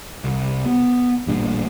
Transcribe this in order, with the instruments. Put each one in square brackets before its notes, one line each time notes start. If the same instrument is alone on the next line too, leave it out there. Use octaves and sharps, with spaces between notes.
[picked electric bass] C2
B3
A1 G2 A#2